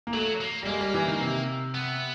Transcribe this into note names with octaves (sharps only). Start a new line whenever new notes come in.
A#3
F#3 A3
A#3
G3
G#3 A#3
G3
E3
D#3
C3
B3